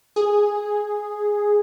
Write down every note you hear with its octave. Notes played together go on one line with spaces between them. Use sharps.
G#4